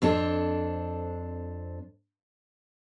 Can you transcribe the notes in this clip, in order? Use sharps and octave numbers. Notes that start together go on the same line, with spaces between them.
F2 C4 D4 A4